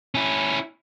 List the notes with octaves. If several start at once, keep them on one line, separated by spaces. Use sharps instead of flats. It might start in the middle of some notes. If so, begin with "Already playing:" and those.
C#4 E4